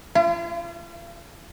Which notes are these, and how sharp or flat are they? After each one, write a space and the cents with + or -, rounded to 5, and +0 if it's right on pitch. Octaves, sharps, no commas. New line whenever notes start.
F4 -40